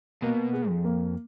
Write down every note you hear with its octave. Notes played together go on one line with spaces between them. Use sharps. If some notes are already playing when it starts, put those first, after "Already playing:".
B2 A#3
G#4
F2
A#3